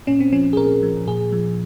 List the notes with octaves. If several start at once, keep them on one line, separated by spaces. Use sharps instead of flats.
A#2 C#4
C4
F3 C#4
G#4
A#2 A#4
F3
A#2 G#4
F3